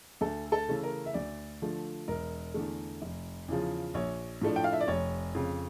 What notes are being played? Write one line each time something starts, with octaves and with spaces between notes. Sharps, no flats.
D2 A4
A4
C#3 E3 A3 C#4
A#4
E5
D2 D5
D3 F3 A3
E1 A#4
E2 D3 A3
F1
E2 C#3 F3
A#1 C#5
A2 F3 A3 D4
G5
F5
E5
D5
F1 C#5
F2 C#3